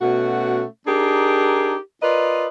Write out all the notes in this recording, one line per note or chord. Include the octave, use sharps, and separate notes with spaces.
B2 A3 C#4 F#4
D4 D#4 G4 G#4 A#4
F4 A#4 B4 D5 D#5